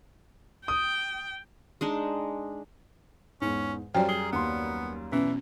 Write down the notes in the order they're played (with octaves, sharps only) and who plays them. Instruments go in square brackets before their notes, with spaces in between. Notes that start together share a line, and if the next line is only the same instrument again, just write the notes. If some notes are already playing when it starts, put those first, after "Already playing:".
[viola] G5 [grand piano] D#6
[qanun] G#3 D4 D#4
[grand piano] E2 G#2 [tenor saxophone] C#4
[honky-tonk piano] F#2 G3 [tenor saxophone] F3 [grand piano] C#5 [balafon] G5
[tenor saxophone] G#4 [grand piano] G7
[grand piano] D#2 C6 [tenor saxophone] B3
[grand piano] B2 [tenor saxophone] E3 [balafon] C#4